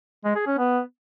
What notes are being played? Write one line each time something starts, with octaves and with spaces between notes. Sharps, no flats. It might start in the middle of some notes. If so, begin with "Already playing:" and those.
G#3
G#4
C#4
B3